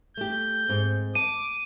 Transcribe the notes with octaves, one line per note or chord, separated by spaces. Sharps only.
A3 G4 G6
G#2 C4
A5 D6 D#7